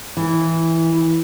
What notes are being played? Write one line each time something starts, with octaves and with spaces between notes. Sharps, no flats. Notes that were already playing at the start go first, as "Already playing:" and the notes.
E3